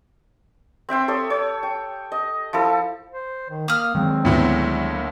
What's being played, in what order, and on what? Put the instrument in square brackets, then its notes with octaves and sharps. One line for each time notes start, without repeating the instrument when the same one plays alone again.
[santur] C4 E5 G5 C6
A4 C#5 D#6
C#5
G5
D#5
F3 E4 A4
[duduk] C5
D#3
[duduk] A#3 [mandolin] D#6 F6
[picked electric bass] D#3 F#3 G#3 [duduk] C4
[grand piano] D2 A2 B3
[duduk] A#3